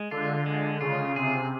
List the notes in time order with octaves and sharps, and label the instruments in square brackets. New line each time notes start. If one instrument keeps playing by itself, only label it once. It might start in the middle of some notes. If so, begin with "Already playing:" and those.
Already playing: [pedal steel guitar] G#3
[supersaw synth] D3 [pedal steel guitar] F4
[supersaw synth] D3 [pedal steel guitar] G#3
[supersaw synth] C#3 [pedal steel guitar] F4
[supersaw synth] C3 [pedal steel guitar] G#4